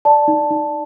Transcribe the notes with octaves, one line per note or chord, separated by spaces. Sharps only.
D5 A5
D#4
D#4